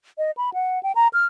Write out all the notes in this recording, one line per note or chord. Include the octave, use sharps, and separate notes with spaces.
D#5
B5
F#5
G5
A#5
F6